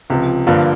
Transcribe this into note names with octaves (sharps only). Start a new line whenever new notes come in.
C#2 C3 F3
G2 D3 F3 A#3